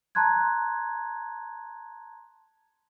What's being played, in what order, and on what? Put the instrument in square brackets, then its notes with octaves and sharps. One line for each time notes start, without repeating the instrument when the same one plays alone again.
[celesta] A5 A#5 C6 F#6 G#6